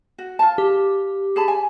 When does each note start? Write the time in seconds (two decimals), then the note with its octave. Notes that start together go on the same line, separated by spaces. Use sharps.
0.18 F#4
0.39 F4 A5
0.58 G4
1.36 G#4 A5 B5
1.48 G#5